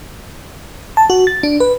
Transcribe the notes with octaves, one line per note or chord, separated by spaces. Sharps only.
A5
F#4
A6
D4
B4